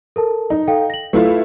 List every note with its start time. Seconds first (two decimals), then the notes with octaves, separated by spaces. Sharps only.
0.16 A4 A#4 A5
0.50 D#4
0.68 A4 F5 G5
0.90 A#6 F#7
1.13 A3 E4 F4 B4